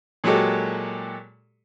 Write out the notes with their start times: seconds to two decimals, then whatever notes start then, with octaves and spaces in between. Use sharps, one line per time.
0.24 A#2 F#3 G#3 F#4 G4 A4